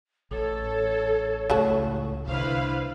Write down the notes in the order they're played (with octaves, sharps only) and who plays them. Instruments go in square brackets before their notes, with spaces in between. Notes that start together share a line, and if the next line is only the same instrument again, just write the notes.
[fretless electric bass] A1 [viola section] A4 [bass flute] C#5
[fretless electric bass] C#2 A2 [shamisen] F#3 F#4 A4 [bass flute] A3
[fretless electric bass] C2 D3 [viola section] E4 B4 F5 [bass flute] C5